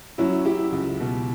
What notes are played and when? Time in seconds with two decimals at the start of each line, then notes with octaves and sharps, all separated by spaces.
0.18 F#3 C#4 E4
0.45 F#3 E4 G4
0.72 C#2
1.00 B2